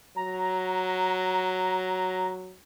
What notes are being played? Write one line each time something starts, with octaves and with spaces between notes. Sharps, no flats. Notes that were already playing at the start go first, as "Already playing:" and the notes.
F#3 A#5